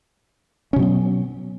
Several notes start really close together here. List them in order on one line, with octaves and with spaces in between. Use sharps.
C#4 B2 F#3 B3